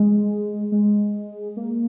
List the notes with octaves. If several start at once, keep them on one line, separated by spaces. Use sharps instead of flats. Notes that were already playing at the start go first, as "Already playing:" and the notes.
Already playing: G#3
G#3
A#3